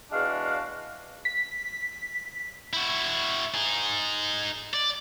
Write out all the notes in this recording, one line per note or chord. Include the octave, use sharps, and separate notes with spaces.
E2 G#3 D4 F#4 F5
B6
E4 F#4
D#4 G#4
D5